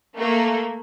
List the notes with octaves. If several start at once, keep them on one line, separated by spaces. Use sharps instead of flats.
A3 A#3